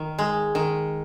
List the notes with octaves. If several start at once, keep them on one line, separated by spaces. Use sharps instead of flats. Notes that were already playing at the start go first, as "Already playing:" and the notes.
Already playing: D#3
G#3
D#3